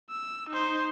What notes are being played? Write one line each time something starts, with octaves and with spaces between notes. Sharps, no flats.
E6
D#4 C5